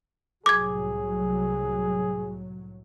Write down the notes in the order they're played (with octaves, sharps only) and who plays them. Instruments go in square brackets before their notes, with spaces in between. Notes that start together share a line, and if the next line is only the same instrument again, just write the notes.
[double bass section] C2 A2 F#3 [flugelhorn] G#4 [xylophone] D6 G#6